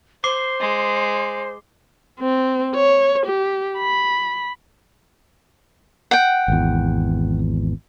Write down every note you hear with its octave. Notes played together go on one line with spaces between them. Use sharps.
C5 D6 C7 G7
G#3
C4
C#5
G4
B5
F#5 G5
G#1 E2